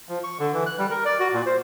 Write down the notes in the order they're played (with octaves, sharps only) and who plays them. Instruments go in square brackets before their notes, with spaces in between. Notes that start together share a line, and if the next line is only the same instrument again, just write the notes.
[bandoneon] F3
C#6
D3
E3
F#6
G3
A#4
D5
F#4
A#2
C5